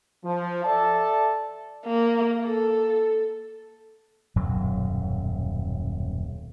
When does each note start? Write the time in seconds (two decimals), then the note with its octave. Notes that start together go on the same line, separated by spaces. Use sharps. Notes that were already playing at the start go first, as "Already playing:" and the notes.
0.24 F3
0.64 A4 D5 E5 A5
1.85 A#3
2.45 A4
4.36 D#1 F#2 B2 F#3